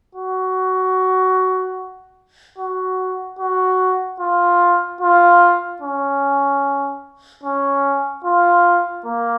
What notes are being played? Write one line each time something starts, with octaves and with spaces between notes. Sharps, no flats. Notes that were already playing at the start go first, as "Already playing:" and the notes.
F#4
F#4
F#4
F4
F4
C#4
C#4
F4
A#3